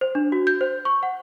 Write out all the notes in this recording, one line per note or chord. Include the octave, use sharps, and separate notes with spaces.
C5
D4
F#4
G6
C5
C#6
F#5